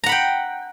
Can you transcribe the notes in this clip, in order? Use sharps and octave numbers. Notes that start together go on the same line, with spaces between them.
F#5 G5 A#5 B5